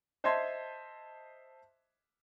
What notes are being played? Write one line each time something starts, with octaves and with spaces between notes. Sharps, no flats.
C5 D#5 E5 A5 C6 G#6